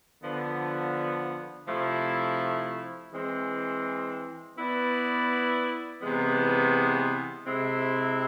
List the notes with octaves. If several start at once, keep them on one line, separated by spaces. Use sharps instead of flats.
D3 F3 B3
C3 F3 A3 E4
E3 G#3 C4
B3 E4 B4 D5
C3 E3 G#3 B3
C3 G#3 C4 E4